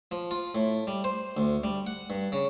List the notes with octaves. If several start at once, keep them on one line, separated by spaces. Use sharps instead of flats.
F3
F4
A2
G3
C5
D2
G3
F#5
G2
C#3